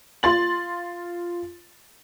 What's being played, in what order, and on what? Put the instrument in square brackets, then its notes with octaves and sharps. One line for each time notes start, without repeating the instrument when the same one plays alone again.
[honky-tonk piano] F4 C6 A6 F#7